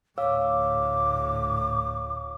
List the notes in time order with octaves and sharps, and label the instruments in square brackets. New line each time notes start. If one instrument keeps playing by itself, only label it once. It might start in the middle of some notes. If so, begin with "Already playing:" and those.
[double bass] D2 A2 [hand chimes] C#5 F5 E6 [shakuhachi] D6